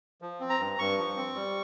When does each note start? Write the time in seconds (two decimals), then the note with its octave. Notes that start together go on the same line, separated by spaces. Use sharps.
0.22 F3
0.40 C4
0.50 A#5
0.60 G2
0.79 G2 C#6
0.98 F3
1.17 C4
1.35 G3